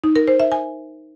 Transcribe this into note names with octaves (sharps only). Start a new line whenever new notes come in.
D#4
A#4
C5
E5
G#5